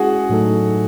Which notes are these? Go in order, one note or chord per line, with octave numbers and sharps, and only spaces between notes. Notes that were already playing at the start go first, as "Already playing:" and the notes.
Already playing: G#3 C#4 E4 F#4 G#4 F#5 G#5
A2 F#3 A3 D#4 A4